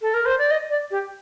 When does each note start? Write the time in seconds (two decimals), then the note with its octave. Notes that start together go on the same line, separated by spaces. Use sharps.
0.01 A4
0.14 A#4
0.25 C5
0.38 D5
0.51 D#5
0.70 D5
0.91 G4